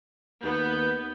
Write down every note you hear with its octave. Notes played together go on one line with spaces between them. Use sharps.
D#2 B3 B4 G6